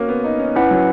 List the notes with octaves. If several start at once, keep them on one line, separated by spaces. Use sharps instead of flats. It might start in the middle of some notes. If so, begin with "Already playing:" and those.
Already playing: A#3 C#4 F#4 A#4
B3
D#4
C#4
C#4 E4 B4 F#5
F#3